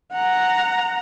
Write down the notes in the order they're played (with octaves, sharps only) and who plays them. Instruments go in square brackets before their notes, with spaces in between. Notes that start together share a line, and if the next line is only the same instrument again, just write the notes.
[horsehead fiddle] F#5 A#5